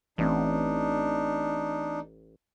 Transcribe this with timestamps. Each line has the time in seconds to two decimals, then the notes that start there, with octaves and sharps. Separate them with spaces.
0.18 A1 E3 A3 C4 D4 D#4